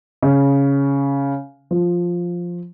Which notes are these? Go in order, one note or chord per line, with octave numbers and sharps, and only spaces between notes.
C#3
F3